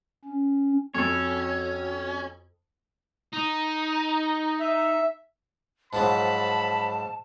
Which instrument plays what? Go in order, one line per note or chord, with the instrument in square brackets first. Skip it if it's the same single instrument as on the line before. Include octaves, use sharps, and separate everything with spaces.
[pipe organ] C#4
[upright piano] F2 [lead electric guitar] C#4 [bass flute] F#4 [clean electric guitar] A4 C#5
[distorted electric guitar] D#4
[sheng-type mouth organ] E5
[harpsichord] G#2 F3 F#3 [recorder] A5 [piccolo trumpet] B5